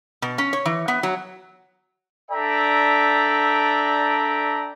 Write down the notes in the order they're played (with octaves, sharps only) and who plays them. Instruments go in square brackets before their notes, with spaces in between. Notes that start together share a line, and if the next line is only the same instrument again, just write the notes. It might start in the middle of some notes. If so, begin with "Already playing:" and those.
[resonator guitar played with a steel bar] B2
C#4
C#5
E3
B3
F#3
[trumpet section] D4 A4 D5 E5 G5 A#5